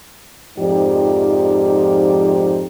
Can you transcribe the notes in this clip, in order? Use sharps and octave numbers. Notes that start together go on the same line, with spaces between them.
F2 G#2 F3 D#4 G4 D5